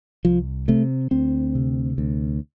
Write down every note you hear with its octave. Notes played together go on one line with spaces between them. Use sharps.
C2 F3
C3 A3
D2 C4
C3
D2